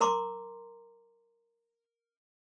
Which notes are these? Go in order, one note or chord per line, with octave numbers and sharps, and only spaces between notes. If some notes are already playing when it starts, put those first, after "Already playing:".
A#4 A#5 C6 D6